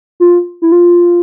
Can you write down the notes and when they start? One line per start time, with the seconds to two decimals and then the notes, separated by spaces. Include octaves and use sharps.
0.20 F4
0.62 E4
0.72 F4